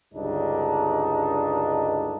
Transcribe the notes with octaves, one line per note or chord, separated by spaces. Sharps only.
C#2 G2 D3 D4 D#4